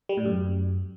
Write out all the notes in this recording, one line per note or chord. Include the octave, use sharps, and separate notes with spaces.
G3
A2
F#2